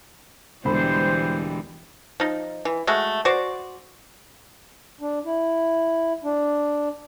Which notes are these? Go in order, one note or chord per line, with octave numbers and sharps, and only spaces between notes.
E1 D3 E3 G3 G#3 C5 B5
F3 D#4
E3
G#3 A3 F#4
F#4 C5 D5
D4
E4
D4